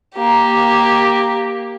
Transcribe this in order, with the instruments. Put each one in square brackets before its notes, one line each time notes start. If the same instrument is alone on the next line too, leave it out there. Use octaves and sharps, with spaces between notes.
[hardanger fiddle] A#3 G4